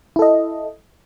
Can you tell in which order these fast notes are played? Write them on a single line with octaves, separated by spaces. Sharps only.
E4 A4 D#5